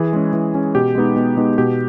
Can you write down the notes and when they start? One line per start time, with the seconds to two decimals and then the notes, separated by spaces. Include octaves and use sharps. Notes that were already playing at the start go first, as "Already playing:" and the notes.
Already playing: E3 G#4
0.13 G#3 C#4
0.33 E3
0.54 G#3 C#4
0.75 B2 G4
0.95 G#3 B3 D#4
1.17 B2
1.37 G#3 B3 D#4
1.58 B2 G4